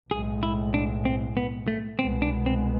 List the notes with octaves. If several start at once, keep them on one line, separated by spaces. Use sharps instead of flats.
B1 A2 G#3 G#4
E4
D4
C4
B3
A3
C2 B2 G#3 B3 C4
D4
C4